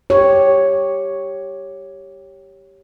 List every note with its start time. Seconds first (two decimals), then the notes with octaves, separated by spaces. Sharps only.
0.10 G4 C#5